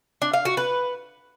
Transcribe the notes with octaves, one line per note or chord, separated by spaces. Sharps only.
D4
F5
F#4
B4